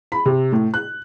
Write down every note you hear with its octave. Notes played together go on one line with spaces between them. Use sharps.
B5
C3
A2
F#6